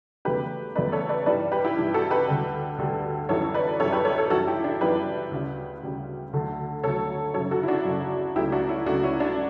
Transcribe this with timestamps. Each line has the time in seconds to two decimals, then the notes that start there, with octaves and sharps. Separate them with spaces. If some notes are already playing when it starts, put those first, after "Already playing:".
0.25 E2 C#3 F#3 A3 G4 B4
0.75 E2 C#3 F#3 A3 B4 D5
0.92 A4 C#5
1.09 B4 D5
1.26 G2 E3 G3 B4 D5
1.52 G4 B4
1.65 E4 G4
1.77 G2 E3 G3
1.94 F#4 A4
2.10 G4 B4
2.28 D2 D3 G3
2.78 D2 D3 G3
3.29 F#2 E3 G3 A4 C#5
3.54 B4 D5
3.80 F#2 E3 G3 A4 C#5
3.92 G4 B4
4.05 A4 C#5
4.18 A4 C#5
4.30 F#2 E3 G3 F#4 A4
4.47 E4 G4
4.64 D4
4.81 F#2 E3 G3 G4 B4
5.31 D2 C#3 G3
5.83 D2 C#3 G3
6.33 D2 D3 F#3 A3
6.83 D2 D3 F#3 A3 A4 C#5
7.34 F#2 C#3 F#3 A4 C#5
7.51 F#4 A4
7.63 E4
7.68 D4 F#4
7.85 F#2 C#3 F#3
8.36 C#2 C#3 F#3 A3 E4 G4
8.52 D4 F#4
8.69 C#4 E4
8.86 C#2 C#3 F#3 A3 D4 F#4
9.03 C#4 E4
9.20 D4